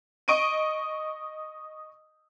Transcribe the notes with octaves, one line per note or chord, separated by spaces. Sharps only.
D#5 C#6 D7 D#7